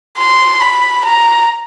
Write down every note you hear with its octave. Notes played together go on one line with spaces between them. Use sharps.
C6
B5
A#5